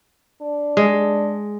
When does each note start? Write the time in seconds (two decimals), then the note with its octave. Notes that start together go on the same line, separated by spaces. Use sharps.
0.42 D4
0.77 G#3